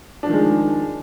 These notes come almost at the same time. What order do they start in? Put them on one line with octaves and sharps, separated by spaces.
D4 F3 D#3 G#3